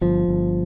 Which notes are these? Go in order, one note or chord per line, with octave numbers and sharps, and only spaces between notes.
G1 F3
G1